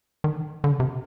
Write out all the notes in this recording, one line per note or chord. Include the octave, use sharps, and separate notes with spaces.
D#3
D3
C#3
C3